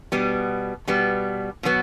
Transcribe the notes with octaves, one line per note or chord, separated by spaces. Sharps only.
B2 G3 B3
B2 G3 B3
B2 F#3 B3